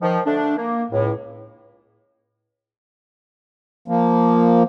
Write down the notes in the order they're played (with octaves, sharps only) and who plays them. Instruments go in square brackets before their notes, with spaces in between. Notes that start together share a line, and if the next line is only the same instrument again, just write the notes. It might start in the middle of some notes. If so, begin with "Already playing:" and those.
[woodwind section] D#3 F3
D3 A3 D4
A#3
C#2 A2
[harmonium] F3 A#3